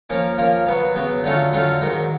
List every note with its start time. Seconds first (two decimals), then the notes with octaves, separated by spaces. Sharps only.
0.10 F3 A#3 C#4
0.38 F3 A#3 C#4
0.66 C#3 F#3 B3
0.95 C#3 F#3 B3
1.23 D3 F#3 A3 C#4 F4
1.53 D3 F#3 A3 C#4 F4
1.81 G#2 D#3 F#3